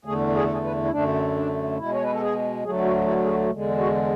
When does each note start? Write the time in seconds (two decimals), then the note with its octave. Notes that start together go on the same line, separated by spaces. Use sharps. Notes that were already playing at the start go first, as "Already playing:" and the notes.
0.05 E2 D3 A3 G#4
0.34 G#4
0.43 A4
0.53 G#4
0.64 B4
0.85 E4
0.91 F#2 D3 A3 D4
1.35 D4
1.78 B2 G#3 E4
1.93 C#5
2.02 B4
2.12 A4
2.21 G#4
2.64 D2 D3 F#3 A3 G#4
2.85 F#4
3.07 E4
3.25 G#4
3.29 F#4
3.50 E2 D3 G#3
3.79 F#4